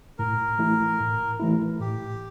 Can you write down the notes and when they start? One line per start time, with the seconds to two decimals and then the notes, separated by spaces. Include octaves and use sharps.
0.19 A2 A#4
0.59 E3 A3 E4
1.00 A2
1.40 E3 A3 E4
1.80 A2 G4